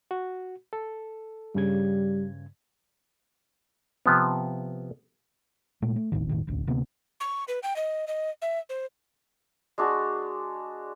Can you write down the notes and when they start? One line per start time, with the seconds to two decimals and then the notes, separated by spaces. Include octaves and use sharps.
0.11 F#4
0.73 A4
1.55 G2 C#3 G3 G#6
4.06 C3 F3 B3
5.82 A#2 G#3 A3
5.96 A3
6.12 D#1 G#1 A2 D#3
6.29 E1 A2 D#3
6.47 E1 A1 D2
6.67 D2 C3 A#3 B3
7.20 C#6
7.48 B4
7.63 G5
7.76 D#5
8.07 D#5
8.42 E5
8.69 C5
9.78 G#3 D4 F#4